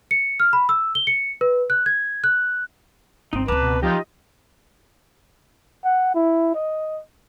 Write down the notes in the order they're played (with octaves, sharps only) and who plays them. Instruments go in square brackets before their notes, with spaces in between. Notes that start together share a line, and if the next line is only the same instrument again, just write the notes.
[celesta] C#7
F6
B5
E6
G7
C#7
B4
F#6
G#6
F#6
[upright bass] G1 [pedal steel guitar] C4 D#4
[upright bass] C#2 C4 [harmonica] B4 [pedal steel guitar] A5 A#5 D6
[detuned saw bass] B2
[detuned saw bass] F3 [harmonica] D#4 F4 G4 [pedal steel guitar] D#5
[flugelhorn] F#5
E4
D#5